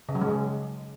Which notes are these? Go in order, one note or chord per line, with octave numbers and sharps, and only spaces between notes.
C#3
F#3
G#3
C#3